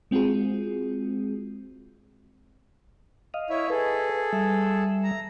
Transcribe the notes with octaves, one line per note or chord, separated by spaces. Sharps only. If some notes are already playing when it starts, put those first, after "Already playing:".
G#3 C4 F4 F#4 G#4
D#5 F5
E4 C#5 E5
G#4 A4 B4
G3 E5
A#5